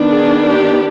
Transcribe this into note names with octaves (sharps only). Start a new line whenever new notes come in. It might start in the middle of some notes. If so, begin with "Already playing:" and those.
Already playing: D#3 B3 D4
G#4
G4